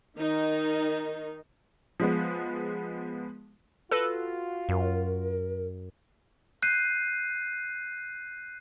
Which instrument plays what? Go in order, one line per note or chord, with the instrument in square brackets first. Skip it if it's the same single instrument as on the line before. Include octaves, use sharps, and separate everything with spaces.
[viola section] D#3 D#4
[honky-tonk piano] F3 G#3 B3
[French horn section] F4 F#4 [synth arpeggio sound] A4 B4 A#6
[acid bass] F#2 [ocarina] A#4
[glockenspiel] F#6 G6 C7 D#7